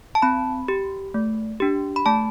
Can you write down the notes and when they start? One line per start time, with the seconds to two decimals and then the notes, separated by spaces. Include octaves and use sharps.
0.15 A5
0.22 C4 B5
0.68 G4
1.14 A3
1.60 D4 G4
1.96 B5
2.06 A3 A5